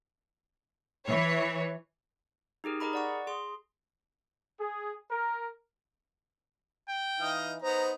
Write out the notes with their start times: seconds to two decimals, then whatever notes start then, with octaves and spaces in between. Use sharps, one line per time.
1.06 E3 C#5
2.64 D#4 G4 G#4 A#4
2.80 G#4 A#4 D#5 A#5 B5
2.93 D5 F#5 C#6
3.27 G#4 C6
4.59 G#4
5.09 A#4
6.89 G5
7.20 E3 D#4 D#5 F5
7.62 B3 D#4 C5 A#5